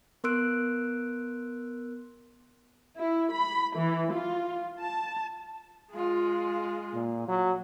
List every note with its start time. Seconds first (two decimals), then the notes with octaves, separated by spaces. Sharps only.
0.24 B3 A#4 C6 E6 F#6 D7
2.98 E4
3.34 B5
3.77 E3
4.13 F4
4.80 A5
5.91 G#3 F4
6.94 A#2
7.28 F#3